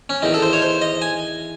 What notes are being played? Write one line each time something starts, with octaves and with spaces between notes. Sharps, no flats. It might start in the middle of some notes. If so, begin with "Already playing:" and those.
C#4
E2 D#3 D#4
A4
C5
C#5
C5
D#5
G#5